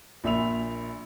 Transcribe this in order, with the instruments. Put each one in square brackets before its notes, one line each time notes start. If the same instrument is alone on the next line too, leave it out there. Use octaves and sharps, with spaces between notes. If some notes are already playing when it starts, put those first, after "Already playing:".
[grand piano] A#1 A#2 E5 B5 E6 F7